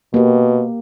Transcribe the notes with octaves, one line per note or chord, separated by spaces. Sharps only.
B2 A#3 G4